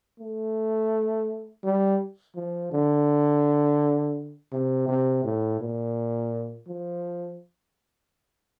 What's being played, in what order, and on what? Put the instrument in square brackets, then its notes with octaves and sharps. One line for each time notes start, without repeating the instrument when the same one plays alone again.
[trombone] A3
G3
F3
D3
C3
C3
A2
A#2
F3